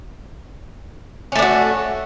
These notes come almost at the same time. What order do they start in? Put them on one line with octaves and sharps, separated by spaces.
C#4 A3 D4 F#4